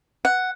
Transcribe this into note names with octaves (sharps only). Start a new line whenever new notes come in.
F#5